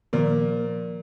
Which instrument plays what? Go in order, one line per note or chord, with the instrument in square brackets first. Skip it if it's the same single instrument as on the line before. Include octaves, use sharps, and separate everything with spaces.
[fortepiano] A#2 [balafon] D#3 F3 [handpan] A#4